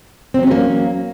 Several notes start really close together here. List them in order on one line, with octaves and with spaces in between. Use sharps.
C4 F#3 C#4 G3 A#3